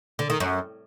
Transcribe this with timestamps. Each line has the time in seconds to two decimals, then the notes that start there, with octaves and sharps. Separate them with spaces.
0.19 D3
0.30 D#3
0.40 F#2